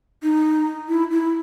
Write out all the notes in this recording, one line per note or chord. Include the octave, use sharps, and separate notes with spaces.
D#4
E4
E4